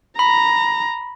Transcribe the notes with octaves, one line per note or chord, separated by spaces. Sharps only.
A#5 B5